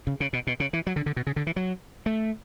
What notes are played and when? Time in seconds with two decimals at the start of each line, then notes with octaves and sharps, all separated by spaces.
0.07 C#3
0.20 C#3
0.33 B2
0.47 B2
0.60 C#3
0.73 E3
0.87 F#3
0.96 D3
1.06 D3
1.16 B2
1.27 C#3
1.36 D3
1.47 E3
1.56 F#3
2.06 A3